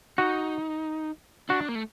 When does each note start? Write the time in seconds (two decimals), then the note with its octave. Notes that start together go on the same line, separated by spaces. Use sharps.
0.18 D#4 F#4
1.49 D4 F#4
1.69 A#3
1.75 A3